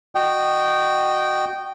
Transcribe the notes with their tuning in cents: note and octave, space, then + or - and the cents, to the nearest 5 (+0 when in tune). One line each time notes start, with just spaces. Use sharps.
F#4 +0 D#5 -25 G5 -15